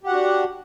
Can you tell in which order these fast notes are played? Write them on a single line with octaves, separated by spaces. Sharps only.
G4 F#5 F#4 D4